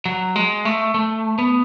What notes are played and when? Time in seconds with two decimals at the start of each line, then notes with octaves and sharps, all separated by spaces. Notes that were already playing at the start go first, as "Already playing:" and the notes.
0.06 F#3
0.36 G#3
0.65 A3
0.94 A3
1.38 B3